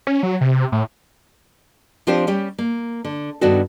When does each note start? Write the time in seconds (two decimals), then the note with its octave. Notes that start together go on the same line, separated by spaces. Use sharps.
0.07 C#4
0.23 F#3
0.41 C3
0.72 A2
2.07 F3 C4 D4 F4 G4 C5
2.27 G3 C#4 G4
2.58 A#3
3.05 D3
3.41 G2 D#3 B3 D4 F#4 A4